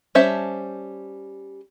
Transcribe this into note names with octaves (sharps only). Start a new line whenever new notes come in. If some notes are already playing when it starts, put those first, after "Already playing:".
G3 C#4 C5 E5 A5